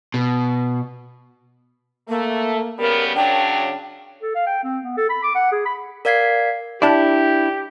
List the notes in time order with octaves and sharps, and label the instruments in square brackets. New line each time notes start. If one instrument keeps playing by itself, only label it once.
[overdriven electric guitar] B2
[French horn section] A3 [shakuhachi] A#3
[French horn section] C#3 G3 B3 [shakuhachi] A#4
[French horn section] C#3 F#3 D4 [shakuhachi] G5
[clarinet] A4
F5
G5
C4
B3
A4
B5
D6
F#5
G#4
B5
[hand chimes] A#4 D5 F5 G#6 B6 C7
[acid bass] D4 [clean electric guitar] E4 [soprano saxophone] G4 [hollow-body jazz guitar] D5 E5 A5